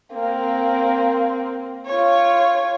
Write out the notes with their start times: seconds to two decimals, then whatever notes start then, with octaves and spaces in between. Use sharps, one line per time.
0.13 A#3 C4
1.86 F4 C#5